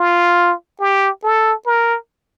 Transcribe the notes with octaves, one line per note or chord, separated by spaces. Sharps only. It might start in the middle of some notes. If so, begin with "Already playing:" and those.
Already playing: F4
G4
A4
A#4